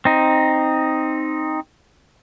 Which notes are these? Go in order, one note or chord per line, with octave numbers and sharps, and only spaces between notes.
C4 D#4